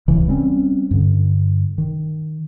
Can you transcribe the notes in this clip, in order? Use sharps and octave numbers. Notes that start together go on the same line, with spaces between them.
D1 C2 C#3 E3
G3 C4 C#4
G2 D3
D#3